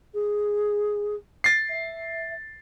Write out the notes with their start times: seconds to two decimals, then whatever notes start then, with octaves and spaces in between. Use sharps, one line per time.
0.14 G#4
1.44 A6 C7
1.69 E5